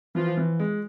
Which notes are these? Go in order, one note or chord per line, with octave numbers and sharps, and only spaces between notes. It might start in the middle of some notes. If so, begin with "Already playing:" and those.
E3 F3 F4
E3
G#3